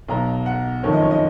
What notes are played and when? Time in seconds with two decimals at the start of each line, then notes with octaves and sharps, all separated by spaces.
0.08 B1 B2 A#5
0.46 F#5
0.83 F#1 F2 D#3 C#5
0.93 D#5
1.02 C#5
1.11 D#5